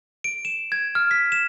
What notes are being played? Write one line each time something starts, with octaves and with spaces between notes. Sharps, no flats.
D7
E7
G#6
F6
B6
E7